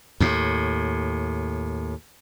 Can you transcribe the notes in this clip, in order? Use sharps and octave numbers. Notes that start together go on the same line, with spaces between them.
D#2 A2